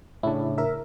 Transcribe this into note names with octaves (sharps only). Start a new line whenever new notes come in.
A2 C#3 D4 E4
A#4 E5